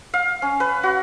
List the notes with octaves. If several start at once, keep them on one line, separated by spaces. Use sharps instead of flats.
F5
C#4
B4
F#4